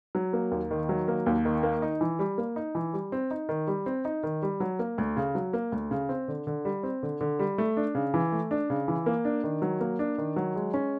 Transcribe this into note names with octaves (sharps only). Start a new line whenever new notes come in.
F#3
A#3
D#2
D#3
F#3
A#3
D#2
D#3
A#3
D#4
E3
G3
A#3
D#4
E3
G3
C4
D#4
D#3
G3
C4
D#4
D#3
G3
F#3
A#3
D2
C#3
F#3
A#3
D2
C#3
C4
D3
D3
G3
C4
D3
D3
G3
A3
D4
C#3
E3
A3
D4
C#3
E3
A#3
D4
D#3
F#3
A#3
D4
D#3
F#3
G#3
C#4